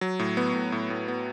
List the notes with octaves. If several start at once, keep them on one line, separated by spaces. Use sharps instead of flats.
F#3
A2
B3
A2
A2
A2
B3